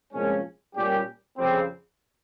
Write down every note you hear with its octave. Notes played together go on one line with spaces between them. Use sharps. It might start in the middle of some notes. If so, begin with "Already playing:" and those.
C2 A#2 F3 G#3 C#4
A#2 G3 C#4 G4
F2 C#3 G3 C4